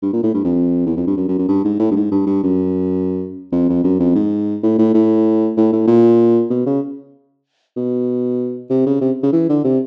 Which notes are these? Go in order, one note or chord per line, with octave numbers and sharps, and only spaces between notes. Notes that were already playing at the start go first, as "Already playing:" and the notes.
G2
A#2
A2
G2
F2
E2
F2
G2
F#2
F#2
F#2
G2
G#2
A2
G2
G#2
G2
G2
F#2
F2
F2
F#2
F2
G#2
A2
A2
A2
A2
A2
A#2
B2
C#3
B2
C3
C#3
C3
C#3
E3
D3
C3